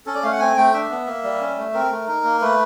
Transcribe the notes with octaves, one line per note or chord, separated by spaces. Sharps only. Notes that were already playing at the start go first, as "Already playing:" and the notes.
C#4 A4
D5
A3 F5
F#5
C4 G#5
A3 G5
D4 E5
B3
A#3
G3
C#4
A3
C4 A#4
A3
D#4
A#3
A3 B4